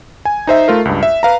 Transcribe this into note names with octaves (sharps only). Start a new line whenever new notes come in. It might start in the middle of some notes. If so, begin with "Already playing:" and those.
G#5
D#4 C5 E5
A3 F4 A#4
C#2 G2
E5
B4 F5 A#5